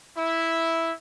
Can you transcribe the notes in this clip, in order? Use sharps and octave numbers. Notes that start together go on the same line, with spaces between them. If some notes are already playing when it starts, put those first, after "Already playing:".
E4